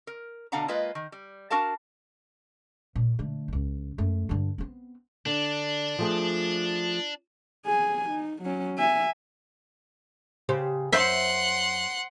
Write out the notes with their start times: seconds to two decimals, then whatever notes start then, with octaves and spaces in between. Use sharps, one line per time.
0.07 A#4
0.52 B2 D3 D4 F5 F#5 A#5
0.68 G#3 A#3 F4 B4 D#5
0.95 D#3
1.12 G3
1.51 D4 F#4 A#4 F5 A5
2.95 A#2
3.19 D3 A3
3.48 D#1 C#2
3.98 F#2 A3
4.29 G2 D3
4.58 B3 C4
5.26 D3 D4
5.99 F3 A3 G#4
7.66 G#4 G#5
8.09 D#4
8.42 F#3 C#4
8.78 E5 G#5
10.49 C#3 G4 C5
10.92 F#2 C5 E5 F#5 C6